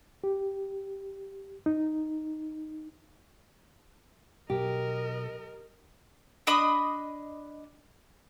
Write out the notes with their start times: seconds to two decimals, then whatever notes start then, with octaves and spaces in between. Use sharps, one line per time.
0.24 G4
1.66 D#4
4.50 B1 G4 A#4 D#5
6.47 D4 D#5 B5 D#6